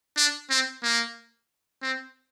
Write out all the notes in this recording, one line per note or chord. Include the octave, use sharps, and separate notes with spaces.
D4
C4
A#3
C4